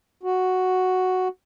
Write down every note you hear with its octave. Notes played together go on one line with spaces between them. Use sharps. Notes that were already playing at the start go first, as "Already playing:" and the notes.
F#4